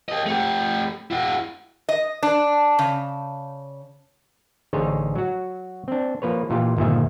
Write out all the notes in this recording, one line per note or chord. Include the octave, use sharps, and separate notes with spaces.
G4 D#5
A3 G4
E4 F#4
D#5
D4
C#3
A1 D3 D#4 G#4 C5 C#5
F#3 F#4
C4 D4
F3 A#3 B4 C#5
A#2 E3 F4 G4
G1 A#2 D#3 F3 E5